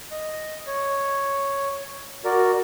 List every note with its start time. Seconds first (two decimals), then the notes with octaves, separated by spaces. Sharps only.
0.11 D#5
0.67 C#5
2.25 F#4 A#4 D5